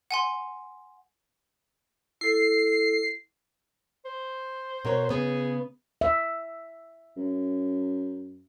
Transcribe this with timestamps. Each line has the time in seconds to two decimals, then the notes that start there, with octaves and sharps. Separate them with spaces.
0.11 F#5 G#5 C6
2.21 E4 A4 C7
4.05 C5
4.85 B2 A#4 C#5
5.10 C#3 B3 G#4
6.01 E5
7.17 F#2